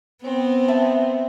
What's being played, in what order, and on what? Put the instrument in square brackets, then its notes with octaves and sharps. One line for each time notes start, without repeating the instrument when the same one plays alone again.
[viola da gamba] B3 [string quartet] C4
[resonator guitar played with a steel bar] E5 A5